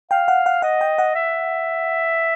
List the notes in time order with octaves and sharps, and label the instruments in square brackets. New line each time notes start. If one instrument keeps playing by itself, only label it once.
[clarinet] F5 [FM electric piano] G5
[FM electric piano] F#5
F#5
[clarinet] D#5 [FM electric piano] F#5
[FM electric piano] G5
F#5
[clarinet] E5